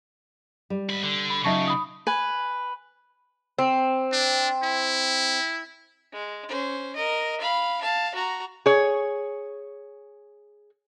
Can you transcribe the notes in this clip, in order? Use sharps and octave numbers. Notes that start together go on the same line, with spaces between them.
G3
G#2 B5
D3
B5
C#3 F#3 D#4 F4 E5 A5 C#6
B5 D#6
B4 G#5
C4
D4
E4
G#3
C#4 C5
A#4 D#5
F5 B5
F5 A5
F#4 A#5
G#4 C#5